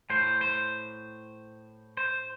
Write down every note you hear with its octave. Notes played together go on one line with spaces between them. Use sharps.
A2 C5
C5
C5